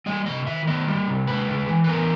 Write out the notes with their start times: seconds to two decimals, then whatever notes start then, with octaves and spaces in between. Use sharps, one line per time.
0.06 G3 D#5
0.26 C3 D#5
0.47 D#3 E5
0.67 B3 D#5
0.87 G3
1.07 C3
1.27 G#3 B4
1.48 C#3
1.69 E3
1.84 B4
1.88 B3 A#4